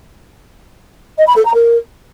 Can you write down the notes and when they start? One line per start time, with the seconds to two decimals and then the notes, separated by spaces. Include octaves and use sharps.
1.17 D#5
1.27 B5
1.36 A4
1.45 A#5
1.54 A#4